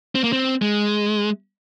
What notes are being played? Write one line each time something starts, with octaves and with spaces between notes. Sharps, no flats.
C4
A#3
C4
G#3